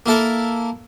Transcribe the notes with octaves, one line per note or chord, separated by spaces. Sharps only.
A#3 E4 A4 A#4